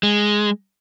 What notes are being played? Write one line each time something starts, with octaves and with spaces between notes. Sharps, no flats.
G#3